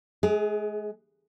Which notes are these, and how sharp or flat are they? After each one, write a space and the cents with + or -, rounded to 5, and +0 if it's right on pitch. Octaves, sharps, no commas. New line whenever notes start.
G#3 +40 G#4 +0